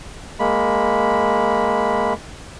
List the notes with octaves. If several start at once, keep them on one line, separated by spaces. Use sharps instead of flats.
G#3 A#3 B5